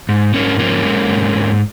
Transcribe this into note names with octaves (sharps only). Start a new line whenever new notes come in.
G#2
G#2 A#3 C#4
F3 A#3 C#4
G#3
G#2
G#2